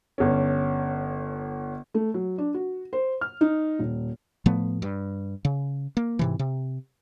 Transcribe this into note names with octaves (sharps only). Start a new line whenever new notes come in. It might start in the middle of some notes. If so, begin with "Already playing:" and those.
G1 C#4
A3
F#3
D4
F#4
C5
F6
D#4
D#1
A2 F3 A3 B3
G2
C#3
A#3
G#2 C3 E3
C3